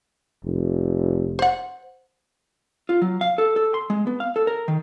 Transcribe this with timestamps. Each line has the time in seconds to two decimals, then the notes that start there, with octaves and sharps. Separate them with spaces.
0.45 F1
1.39 C5 F#5
2.89 F4
3.02 F#3
3.21 F5
3.38 A4
3.56 A4
3.74 C6
3.90 G#3
4.07 B3
4.20 F5
4.36 A4
4.47 A#4
4.68 D#3